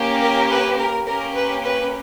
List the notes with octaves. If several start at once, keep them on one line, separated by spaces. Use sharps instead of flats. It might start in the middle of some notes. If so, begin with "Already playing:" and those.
Already playing: A#3 C#4 G4
A#4
B4
A#4
A#3 C#4 G4 A#4
B4
B4